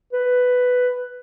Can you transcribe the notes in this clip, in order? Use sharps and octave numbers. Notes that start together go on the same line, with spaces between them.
B4